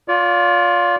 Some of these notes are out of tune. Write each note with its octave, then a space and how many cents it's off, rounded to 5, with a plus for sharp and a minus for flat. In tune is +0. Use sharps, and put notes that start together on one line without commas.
F4 +15 D5 -35